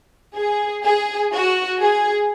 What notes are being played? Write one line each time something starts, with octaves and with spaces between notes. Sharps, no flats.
G#4
G#4
F#4
G#4